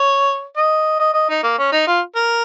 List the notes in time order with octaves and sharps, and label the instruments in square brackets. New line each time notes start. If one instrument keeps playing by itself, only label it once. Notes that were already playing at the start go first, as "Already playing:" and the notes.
Already playing: [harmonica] C#5
D#5
D#5
D#5
D#4
A#3
C#4
D#4
F4
A#4